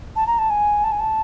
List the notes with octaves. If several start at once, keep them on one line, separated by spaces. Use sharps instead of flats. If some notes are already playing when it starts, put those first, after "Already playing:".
A5
A#5
A5
G#5
A5
G#5
A5